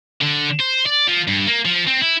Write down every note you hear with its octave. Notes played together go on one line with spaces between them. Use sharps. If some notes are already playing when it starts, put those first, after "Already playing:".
D3
C5
D5
F3
G2
A#3
F3
C4
E4